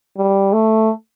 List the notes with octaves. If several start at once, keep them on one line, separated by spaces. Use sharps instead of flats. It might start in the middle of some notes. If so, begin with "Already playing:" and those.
G3
A3